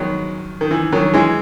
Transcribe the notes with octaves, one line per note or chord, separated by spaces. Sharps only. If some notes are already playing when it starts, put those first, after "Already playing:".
Already playing: D#3 F#3 G#3 B3
D#3
E3
D#3 F#3
E3 G#3